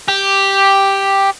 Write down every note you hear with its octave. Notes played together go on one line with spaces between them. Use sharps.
G4